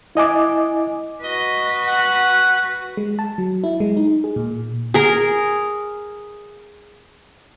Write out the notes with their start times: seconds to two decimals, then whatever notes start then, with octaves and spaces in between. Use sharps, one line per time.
0.15 E4 D#5 G#5 D6
1.24 F#4 B4 D#5
1.86 F#5
2.97 G#3
3.19 A5
3.38 F#3
3.64 E4
3.80 G#3
3.97 D#4
4.24 G#4
4.36 A#2
4.94 G#4 A#4